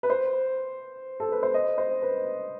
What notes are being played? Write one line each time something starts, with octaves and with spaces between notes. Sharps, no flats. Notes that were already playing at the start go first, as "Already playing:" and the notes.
B4
C5
A4
B4
C5
D#5
C5
B4